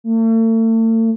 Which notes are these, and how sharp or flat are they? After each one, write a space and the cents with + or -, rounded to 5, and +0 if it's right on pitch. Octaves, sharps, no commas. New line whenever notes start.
A3 +40